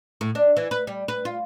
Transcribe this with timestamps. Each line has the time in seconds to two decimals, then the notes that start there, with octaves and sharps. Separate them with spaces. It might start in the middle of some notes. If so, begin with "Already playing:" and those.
0.21 A2
0.35 D4
0.57 E3
0.71 B4
0.87 G3
1.08 B4
1.25 F4